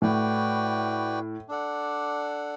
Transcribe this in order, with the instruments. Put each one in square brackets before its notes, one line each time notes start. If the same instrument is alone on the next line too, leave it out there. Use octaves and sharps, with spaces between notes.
[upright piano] A2 [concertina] F#4 B4 D5 G5
[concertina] D4 A4 D5 F#5